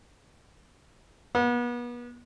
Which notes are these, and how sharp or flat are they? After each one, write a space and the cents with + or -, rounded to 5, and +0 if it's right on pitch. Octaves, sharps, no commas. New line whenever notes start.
B3 -35